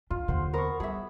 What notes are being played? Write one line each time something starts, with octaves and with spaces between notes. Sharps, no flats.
D4 F4
D#2 D3 C5 F#5
B3 A#4 C5 C#6
G3 G#4 E5 B5 D6